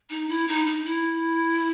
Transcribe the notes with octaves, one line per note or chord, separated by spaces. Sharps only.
D#4
E4
D#4
D#4
E4